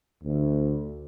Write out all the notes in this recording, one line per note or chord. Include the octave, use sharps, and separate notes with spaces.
D2